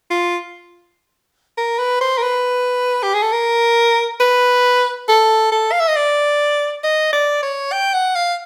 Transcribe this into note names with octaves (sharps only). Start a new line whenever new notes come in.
F4
A#4
B4
C5
A#4
B4
G4
G#4
A4
A#4
B4
A4
A4
F5
E5
D#5
D5
D#5
D5
C#5
G5
F#5
F5